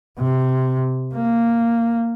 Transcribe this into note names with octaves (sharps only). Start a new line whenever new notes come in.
C3
A#3